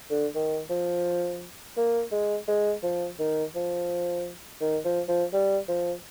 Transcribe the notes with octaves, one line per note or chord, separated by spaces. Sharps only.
D3
D#3
F3
A#3
G#3
G#3
F3
D#3
F3
D#3
F3
F3
G3
F3